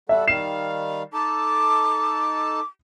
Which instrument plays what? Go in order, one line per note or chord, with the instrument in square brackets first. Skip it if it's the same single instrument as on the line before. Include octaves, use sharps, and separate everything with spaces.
[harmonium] G3 F#4 A4 [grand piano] E5
[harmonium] D#3 G3 F5 [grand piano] C7 E7
[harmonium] D#4 A4 A5 [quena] D6